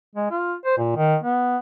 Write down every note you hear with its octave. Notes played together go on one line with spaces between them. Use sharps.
G#3
F4
C5
A#2
D#3
B3